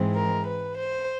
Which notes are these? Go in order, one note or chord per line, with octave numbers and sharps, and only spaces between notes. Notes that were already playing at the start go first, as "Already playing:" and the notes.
Already playing: G#2 E3 G#3 C4
A#4
B4
C5